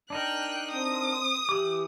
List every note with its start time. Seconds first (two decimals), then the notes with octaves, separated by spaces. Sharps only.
0.10 D4 D#4 A#4 G5 F#6
0.71 C4 D#6
1.49 E3 G4 D6